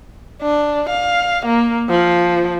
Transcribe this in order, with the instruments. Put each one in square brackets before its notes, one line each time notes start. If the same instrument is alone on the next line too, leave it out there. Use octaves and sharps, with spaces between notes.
[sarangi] D4
F5
A#3
F3